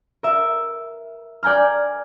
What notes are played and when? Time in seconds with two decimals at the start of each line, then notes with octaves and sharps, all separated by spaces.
0.23 A#4 E5
1.43 D5 G5 G#5 A#5 F6